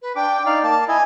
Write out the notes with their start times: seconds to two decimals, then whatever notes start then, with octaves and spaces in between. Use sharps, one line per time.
0.02 B4
0.16 D4 G5 D6
0.46 D#4 D5 F5
0.63 A#3 A5
0.88 E4 D#5 G#5